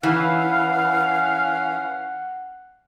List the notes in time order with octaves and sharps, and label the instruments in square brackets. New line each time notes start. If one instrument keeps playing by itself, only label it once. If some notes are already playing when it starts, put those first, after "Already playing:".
[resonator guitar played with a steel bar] E3 [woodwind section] C#4 F5 [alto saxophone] F#5